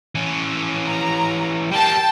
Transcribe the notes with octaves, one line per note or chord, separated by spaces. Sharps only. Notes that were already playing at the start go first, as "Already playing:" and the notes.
E3 C#4
A#5
G3 A#3 G5 A5